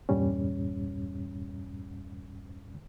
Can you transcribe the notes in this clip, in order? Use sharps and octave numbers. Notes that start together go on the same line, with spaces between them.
E2 G2 A#2 G3 C#4